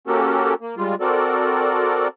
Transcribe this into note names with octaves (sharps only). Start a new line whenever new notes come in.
A#3 C#4 F#4 G4 A4 A#4
A#3
G3 G#3 F4
C4 F#4 A4 A#4 D5